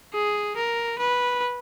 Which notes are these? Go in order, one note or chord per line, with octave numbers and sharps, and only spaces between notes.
G#4
A#4
B4